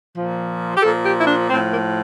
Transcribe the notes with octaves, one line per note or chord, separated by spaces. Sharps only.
A#2 F3
G4
A#2 F3 A4
G4
E4
D4
A2 F3 C4
A#3